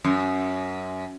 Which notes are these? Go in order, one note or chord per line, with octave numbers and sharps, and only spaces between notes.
F#2